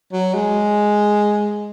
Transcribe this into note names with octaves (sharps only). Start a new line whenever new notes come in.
F#3
G#3